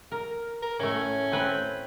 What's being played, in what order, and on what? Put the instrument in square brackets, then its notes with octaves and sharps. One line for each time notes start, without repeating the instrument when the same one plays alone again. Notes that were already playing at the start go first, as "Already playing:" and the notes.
[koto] A#4
[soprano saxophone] A#4
[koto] A2 A3 [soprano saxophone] C#4
[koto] C4 B4 G5